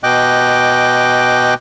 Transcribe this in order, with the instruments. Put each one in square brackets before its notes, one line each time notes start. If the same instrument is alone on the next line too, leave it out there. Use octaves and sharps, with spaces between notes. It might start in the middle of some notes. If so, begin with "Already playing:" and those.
[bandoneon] B2 D#5 G5 D6 F#6